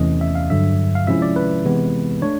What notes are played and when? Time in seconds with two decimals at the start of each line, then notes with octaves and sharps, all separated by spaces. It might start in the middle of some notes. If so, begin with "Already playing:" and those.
Already playing: E2 C3 E3 A3 C#4 D#5
0.21 E5
0.35 F5
0.50 G2 D3 F#3 E5
0.95 F5
1.07 C3 F3 G#3 C#4 E4 E5
1.22 D5
1.36 B4
1.65 C3 E3 G#3 B3
2.22 A3 D4 C#5